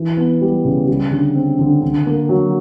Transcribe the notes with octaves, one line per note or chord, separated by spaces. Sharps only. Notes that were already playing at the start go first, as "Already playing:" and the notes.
Already playing: E3
B3
G3
C#3
G3
D3
C4
D3
D3
A#3
F#3